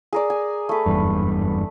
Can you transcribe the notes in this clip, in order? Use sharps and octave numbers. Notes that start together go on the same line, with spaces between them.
G#4 A#4 D5
G#5
A3 B4
F#1 E2 G2